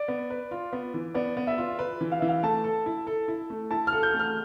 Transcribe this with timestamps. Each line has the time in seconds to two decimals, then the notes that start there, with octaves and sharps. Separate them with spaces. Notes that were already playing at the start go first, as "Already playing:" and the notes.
Already playing: D5
0.08 B3
0.30 B4
0.51 F4
0.73 B3
0.94 E3
1.14 B3 D5
1.37 B3
1.47 E5
1.58 F4
1.79 B4
2.01 E3
2.12 F5
2.20 E3 E5
2.29 F5
2.43 A3 A5
2.64 A4
2.86 E4
3.07 A4
3.28 E4
3.50 A3
3.71 E4 A5
3.87 F6
3.93 A4
4.03 G6
4.14 A3
4.19 F6